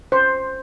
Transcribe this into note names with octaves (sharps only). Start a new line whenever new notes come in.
C#4 C5